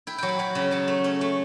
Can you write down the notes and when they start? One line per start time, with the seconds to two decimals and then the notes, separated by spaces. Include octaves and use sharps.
0.07 E4 G5
0.18 F#3 G5
0.29 B5
0.39 F#3 B5
0.55 C#3
0.71 F#3 A5
0.88 A3
1.04 C#4
1.21 A3